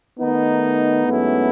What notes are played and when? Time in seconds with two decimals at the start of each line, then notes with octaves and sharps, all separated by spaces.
0.19 D#3 A3 B3 D#4
1.08 G#2 F#3 A3 C#4 E4